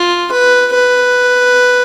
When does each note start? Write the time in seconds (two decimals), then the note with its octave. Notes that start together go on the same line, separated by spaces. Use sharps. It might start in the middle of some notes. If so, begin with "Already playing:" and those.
Already playing: F4
0.32 B4
0.74 B4